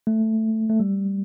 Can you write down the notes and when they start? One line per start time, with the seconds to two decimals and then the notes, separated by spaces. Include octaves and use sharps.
0.07 A3
0.70 A3
0.80 G3